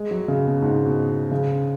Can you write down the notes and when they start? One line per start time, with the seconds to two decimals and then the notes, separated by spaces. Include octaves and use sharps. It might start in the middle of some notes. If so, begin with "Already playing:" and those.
Already playing: G#3
0.11 F#3
0.28 C#3
0.45 B2
0.62 G#2
0.85 B2
1.31 C#3